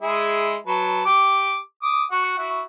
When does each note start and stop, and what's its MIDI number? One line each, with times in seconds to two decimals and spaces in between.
0.02 0.56 56
0.02 0.56 64
0.02 0.56 68
0.67 1.04 54
0.67 1.04 71
0.67 1.04 81
1.05 1.58 67
1.05 1.58 86
1.83 2.03 86
1.83 2.03 87
2.12 2.36 66
2.12 2.36 78
2.38 2.62 64
2.38 2.62 66